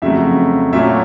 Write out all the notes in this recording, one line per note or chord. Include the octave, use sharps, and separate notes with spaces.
F2 C#3 F#3 A3 E5
A#2 F#3 A3 C#4 E5